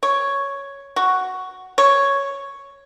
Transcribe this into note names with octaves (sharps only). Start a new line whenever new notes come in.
C#5
F#4
C#5